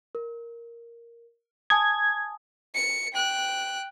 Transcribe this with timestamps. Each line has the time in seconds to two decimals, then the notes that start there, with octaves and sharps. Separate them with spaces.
0.15 A#4
1.70 G#5 A5 D#6 G#6
2.75 C#7
3.13 G5 F#6